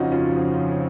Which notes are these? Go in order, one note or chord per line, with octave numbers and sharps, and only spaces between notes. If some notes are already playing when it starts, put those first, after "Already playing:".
Already playing: F2 C#3 F3 C4 C#4 D#4 F4 F#4
C#4 F4